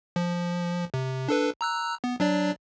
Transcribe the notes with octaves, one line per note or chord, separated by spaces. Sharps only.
F3
C3
D4 A4 B4
A#5 E6 F#6
B3
F#3 D4 D5